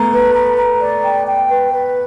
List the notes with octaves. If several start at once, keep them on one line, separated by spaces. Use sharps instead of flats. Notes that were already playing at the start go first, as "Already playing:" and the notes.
Already playing: A3 B3 A#5
B4
A#5
A#5
D5
G5
G5
B4
B4